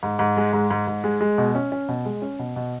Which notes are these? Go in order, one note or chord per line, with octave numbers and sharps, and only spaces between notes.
G#2
G#2
G#3
G#2
G#2
G#2
G#3
G#3
B2
C#4
C#4
B2
G#3
C#4
B2
B2